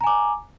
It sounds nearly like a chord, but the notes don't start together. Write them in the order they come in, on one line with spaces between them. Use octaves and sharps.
A#5 G#5 D6